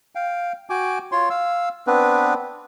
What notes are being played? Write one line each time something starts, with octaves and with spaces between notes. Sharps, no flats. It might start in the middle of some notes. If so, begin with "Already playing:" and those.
F5 G5
F#4 G5 G#5 D6
F4 C#5 C6
F5 E6
B3 C4 D4 B4